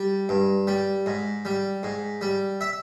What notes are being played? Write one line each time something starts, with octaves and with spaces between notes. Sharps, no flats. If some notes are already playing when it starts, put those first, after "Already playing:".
Already playing: G3
G2
G3
G#2
G3
G#2
G3
E5